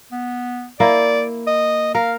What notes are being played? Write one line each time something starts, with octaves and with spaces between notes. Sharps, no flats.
B3
A#3 E4 D5
D#5
A#4 F5